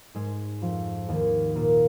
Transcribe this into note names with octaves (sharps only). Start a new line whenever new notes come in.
G#2 G#3
F2 F3
D#2 D#3
A#2 A#3